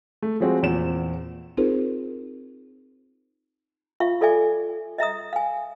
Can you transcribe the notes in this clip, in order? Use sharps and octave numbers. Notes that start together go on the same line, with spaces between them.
A3
F3 G#3 C4 F#4
E2 A#2 C4 E7
C4 D#4 F4 G#4 A#4 C5
F4 E5 F5 C#6
F4 A4 D5 E5 G#5 D6
D#5 E5 A#5 D#6
F5 G#5